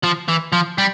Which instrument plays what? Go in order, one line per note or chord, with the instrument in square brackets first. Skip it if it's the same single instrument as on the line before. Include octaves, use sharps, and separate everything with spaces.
[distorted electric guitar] F3
E3
F3
G3